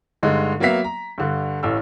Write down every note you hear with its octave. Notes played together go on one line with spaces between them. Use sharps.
G2 D3 G#3 D#4
F#3 A#3 B3 E5 F5 B6
A#5
G2 D3
A1 A2 F5 E6